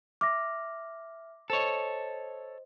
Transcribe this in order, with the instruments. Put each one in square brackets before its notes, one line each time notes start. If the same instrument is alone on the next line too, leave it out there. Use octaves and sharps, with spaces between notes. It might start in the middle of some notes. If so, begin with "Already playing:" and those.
[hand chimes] E5 F6 [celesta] D6 A#6
[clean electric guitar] A4 C#5 [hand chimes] C5 D#5